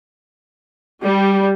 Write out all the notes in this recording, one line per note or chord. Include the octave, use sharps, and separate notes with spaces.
G3